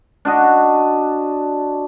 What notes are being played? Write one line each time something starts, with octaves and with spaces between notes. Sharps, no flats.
D4 F#4 D#5